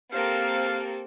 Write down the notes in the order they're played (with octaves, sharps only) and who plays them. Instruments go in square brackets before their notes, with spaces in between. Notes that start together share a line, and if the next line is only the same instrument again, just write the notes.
[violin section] A#3 C4 A4 [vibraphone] G4 [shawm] F5